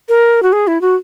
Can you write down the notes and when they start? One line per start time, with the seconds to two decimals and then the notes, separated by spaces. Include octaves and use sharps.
0.09 A#4
0.43 F#4
0.52 G#4
0.67 E4
0.81 F#4